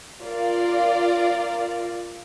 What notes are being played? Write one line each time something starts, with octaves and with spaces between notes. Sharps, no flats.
F4 A#4 D5 F5